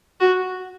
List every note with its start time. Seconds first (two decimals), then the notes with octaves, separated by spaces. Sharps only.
0.20 F#4